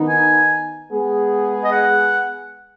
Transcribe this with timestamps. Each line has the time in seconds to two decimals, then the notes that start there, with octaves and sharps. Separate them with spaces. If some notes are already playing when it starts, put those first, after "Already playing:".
Already playing: D#3 B3 D#4
0.08 G#5
0.91 G#3 B3 G#4
1.64 D#5
1.72 F#5